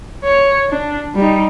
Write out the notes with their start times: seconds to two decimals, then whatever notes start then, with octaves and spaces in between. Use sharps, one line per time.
0.24 C#5
0.70 D4
1.15 G3 D#4